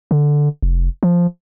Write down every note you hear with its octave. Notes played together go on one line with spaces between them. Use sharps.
D3
F1
F3